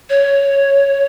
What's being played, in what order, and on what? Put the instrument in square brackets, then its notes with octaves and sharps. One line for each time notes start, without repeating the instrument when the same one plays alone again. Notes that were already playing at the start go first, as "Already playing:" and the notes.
[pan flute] C#5